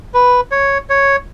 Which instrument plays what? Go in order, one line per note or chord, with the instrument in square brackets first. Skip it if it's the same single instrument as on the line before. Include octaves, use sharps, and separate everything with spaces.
[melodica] B4
C#5
C#5